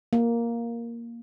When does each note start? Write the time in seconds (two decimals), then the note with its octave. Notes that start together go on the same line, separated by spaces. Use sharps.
0.13 A#3